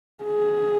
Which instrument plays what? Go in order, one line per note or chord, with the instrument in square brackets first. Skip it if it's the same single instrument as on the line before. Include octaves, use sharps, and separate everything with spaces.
[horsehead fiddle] G#4